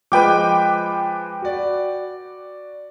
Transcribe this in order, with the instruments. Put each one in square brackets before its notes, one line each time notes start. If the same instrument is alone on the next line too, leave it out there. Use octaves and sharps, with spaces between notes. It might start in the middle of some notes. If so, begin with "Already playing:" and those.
[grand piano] F3 G#3 [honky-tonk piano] B4 G5 D6
[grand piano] F#4 D5